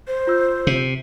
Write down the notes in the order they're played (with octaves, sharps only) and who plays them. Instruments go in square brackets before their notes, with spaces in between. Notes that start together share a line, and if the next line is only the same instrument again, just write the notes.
[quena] C5
[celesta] F4 E6 G6
[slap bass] C3